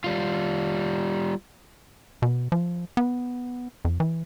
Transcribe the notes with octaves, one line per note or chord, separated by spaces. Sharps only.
G3 F4
B2
F3
B3
F2
E3